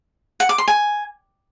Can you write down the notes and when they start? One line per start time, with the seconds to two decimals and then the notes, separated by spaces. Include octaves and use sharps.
0.40 F#5
0.49 D6
0.58 C6
0.68 G#5